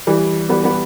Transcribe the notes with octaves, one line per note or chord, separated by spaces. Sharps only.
E3 G3
G3 B3
G3 B3